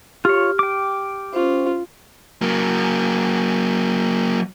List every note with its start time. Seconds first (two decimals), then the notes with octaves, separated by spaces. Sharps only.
0.25 F4 G4 C#5 F6
0.59 G5 D6
1.33 C#4 F4 C5
2.42 F#3 A#3